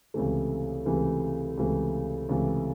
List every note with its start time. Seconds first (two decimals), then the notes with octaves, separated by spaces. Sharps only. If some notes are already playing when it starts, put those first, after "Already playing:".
0.14 C#2 C3 E3 A3
0.85 C#2 C3 E3 A3
1.57 C#2 C3 E3 A3
2.29 C#2 C3 E3 A3